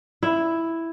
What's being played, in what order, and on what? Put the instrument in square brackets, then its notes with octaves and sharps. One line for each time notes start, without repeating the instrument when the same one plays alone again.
[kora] E4